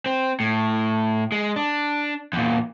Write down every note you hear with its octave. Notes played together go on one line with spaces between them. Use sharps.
C4
A2
G#3
D4
E2 A#2